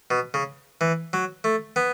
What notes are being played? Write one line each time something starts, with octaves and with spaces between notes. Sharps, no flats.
B2
C#3
E3
F#3
A3
B3